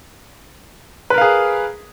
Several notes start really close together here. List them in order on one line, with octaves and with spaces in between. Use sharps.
B4 A#4 F5 G#4